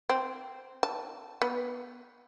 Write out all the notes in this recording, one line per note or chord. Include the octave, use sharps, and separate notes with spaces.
C4
A5
B3